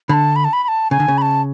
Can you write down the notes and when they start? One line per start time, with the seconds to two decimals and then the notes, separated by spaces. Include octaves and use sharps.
0.09 D3 A5 B5
0.36 B5
0.44 A5
0.53 B5
0.63 B5
0.68 A5
0.91 C#3 G#5
1.00 D3
1.08 C#3
1.18 B5
1.22 A5